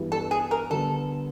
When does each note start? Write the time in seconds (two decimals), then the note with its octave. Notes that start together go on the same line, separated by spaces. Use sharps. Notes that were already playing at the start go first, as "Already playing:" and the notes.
Already playing: G2 E3 G3 B3 E4
0.12 A4
0.31 G#4
0.51 A#4
0.71 D3 G3 B3 A4